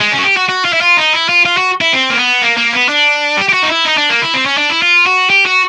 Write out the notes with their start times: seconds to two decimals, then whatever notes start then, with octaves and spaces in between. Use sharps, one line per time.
0.01 G#3
0.13 C#4
0.19 F#4
0.25 G4
0.37 F#4
0.49 F#4
0.65 F4
0.73 E4
0.81 F4
0.97 D#4
1.13 E4
1.29 F4
1.45 F4
1.57 F#4
1.81 E4
1.93 C4
2.10 A#3
2.17 B3
2.42 A#3
2.57 A#3
2.73 B3
2.89 D4
3.37 G4
3.49 G4
3.54 F#4
3.63 D#4
3.70 E4
3.85 D#4
3.98 D4
4.10 A#3
4.22 E4
4.34 C4
4.46 C#4
4.58 D4
4.70 E4
4.82 F4
5.06 F#4
5.30 G4
5.46 F#4